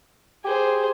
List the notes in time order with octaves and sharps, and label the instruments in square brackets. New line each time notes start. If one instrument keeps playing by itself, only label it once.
[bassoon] G4 [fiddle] G#4 C5